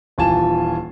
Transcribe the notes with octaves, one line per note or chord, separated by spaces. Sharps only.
D#1 E3 F4 G#5 A5 E7